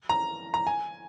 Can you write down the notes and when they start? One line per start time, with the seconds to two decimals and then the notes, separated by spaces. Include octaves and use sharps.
0.09 A#5
0.54 A#5
0.67 G#5